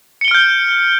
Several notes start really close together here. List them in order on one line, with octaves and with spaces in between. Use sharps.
C#7 G7 D7 F6 G6